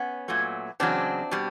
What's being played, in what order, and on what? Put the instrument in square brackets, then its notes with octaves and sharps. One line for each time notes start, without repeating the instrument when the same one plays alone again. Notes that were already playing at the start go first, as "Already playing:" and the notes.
Already playing: [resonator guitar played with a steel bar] B3 C#4
A#2 F#3 A3
E2 C#3 F#3 C4 D4
B2 G3